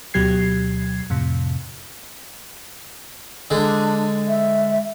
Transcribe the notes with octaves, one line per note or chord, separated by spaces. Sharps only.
D2 B2 F#3 G4 G#6 C7
F2 A2 C3
D3 G#3 D4
E5